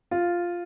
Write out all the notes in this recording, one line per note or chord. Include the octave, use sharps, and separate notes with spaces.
F4